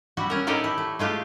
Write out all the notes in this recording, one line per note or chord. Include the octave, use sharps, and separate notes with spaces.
G3 E4 F#4
C#4 A#4
A2 D#4 G4 A4 A#4 D5
E4
A3
G#3 A3 F4 G4